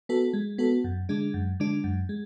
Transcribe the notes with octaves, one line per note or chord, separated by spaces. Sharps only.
B3 F#4 A4
G#3
B3 F#4 A4
F#2
D3 G#3 D4
F#2
D3 G#3 D4
F#2
G#3